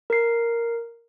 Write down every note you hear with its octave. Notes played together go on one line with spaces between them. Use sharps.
A#4 C7